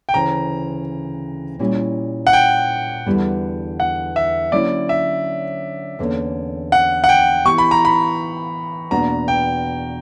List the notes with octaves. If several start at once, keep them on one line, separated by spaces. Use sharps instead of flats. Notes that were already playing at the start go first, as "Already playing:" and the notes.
G5
D2 C#3 E3 A#5
A#2 G3 C#4 E4
F#5
G5
E2 D3 G3 B3 E4
F#5
E5
D3 F#3 A#3 C#4 E4 D5
E5
E2 D3 A#3 C#4
F#5
F#5
G5
E3 B3 E4 G4 C#6
B5
A#5
B5
E2 B2 A#3 D4 F#4 A#5
G5